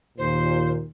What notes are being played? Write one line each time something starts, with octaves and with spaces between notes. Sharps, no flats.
D#2 A#2 C5